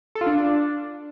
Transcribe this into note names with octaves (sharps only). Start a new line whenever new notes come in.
A4
F4
D4